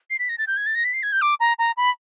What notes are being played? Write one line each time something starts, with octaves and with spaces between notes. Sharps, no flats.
C7
B6
A#6
A6
G6
G#6
A6
A#6
B6
C7
G#6
G6
D6
A#5
A#5
B5